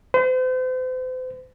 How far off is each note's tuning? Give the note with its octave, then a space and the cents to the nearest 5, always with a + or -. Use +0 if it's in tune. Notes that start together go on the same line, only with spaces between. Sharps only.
C5 -40